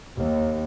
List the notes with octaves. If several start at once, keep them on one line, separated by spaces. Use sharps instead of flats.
D#2